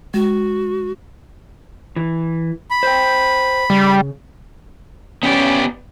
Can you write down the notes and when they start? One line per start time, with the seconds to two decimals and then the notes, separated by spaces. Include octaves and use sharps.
0.14 G#3 F#4
1.96 E3
2.71 B5
2.83 C5 G5
3.70 C#3 G3
5.23 B3 C#4 G4 D5